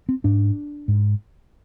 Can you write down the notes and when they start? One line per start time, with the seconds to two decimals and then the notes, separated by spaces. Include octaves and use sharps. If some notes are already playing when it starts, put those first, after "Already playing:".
0.09 C4
0.24 G#2 D4
0.88 G#2